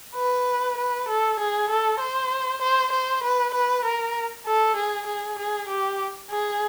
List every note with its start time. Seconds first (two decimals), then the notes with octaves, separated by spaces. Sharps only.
0.16 B4
0.78 B4
1.08 A4
1.39 G#4
1.70 A4
2.00 C5
2.61 C5
2.92 C5
3.23 B4
3.54 B4
3.85 A#4
4.46 A4
4.76 G#4
5.07 G#4
5.38 G#4
5.68 G4
6.30 G#4